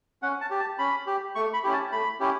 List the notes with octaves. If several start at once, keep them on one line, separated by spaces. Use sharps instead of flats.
C#4 F#5
A5
G4
A5
C#4 B5
G4
A3 C#6
B5
C#4 E4 G4
A5
A3 B5
C#4 E4 G4